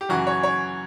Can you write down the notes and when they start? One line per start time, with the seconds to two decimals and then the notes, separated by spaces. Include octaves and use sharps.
0.01 G4
0.09 F#2 C#3 E3 F#4
0.27 C#5
0.43 C#5